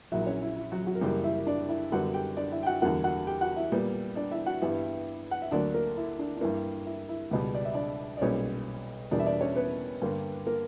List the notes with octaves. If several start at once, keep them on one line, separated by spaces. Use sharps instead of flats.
A#1 A#2 F#3 E4 E5
C#4 C#5
E4
E4
F#3 F#4
F#3 F#4
A#4
F#2 C#3 E3 G3 A#3 G4
E4 E5
D4 D5
E4 E5
F#2 D3 G3 B3 F#4 F#5
G4 G5
D4 D5
E4 E5
G5
F#4 F#5
E2 D3 G3 A#3 F#4 F#5
F#4 F#5
G4 G5
F#4 F#5
E4 E5
A#2 G3 B3
D4 D5
E4 E5
F#4 F#5
G2 E3 G3 B3 E4 E5
F#5
E5
D2 D3 F#3 A#3 D4 D5
A#3 A#4
E4
D4
D4
G2 E3 A#3 E4
E4
E4
C#2 B2 G3
D5
E5
D4 D5
D5
B1 A#2 G3 B3 C#4 C#5
E2 B2 G3 A#3 D4 D5
E5
D4 D5
C#4 C#5
B3 B4
G2 D3 A#3
A#3 A#4